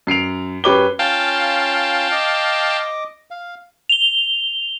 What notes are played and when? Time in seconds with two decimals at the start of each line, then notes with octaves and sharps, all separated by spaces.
0.07 F#2 C7 D7 F7
0.64 F#2 G4 B4 C#5 D6 G7
0.99 C#4 F4 F5 G5 A5
2.12 D#5 D6
3.31 F5
3.89 F7 G7